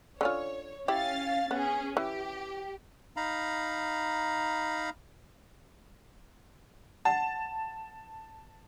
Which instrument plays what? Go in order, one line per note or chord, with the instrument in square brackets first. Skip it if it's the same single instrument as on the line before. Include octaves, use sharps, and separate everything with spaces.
[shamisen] D3 C#4 F4 [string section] C#5
[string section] C#4 F5 A6 [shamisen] E4 G4
[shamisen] B3 [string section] C#4 G#4
[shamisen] E3 [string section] G4
[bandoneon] D#4 F5 A#5 B5
[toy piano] F#5 [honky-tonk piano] A5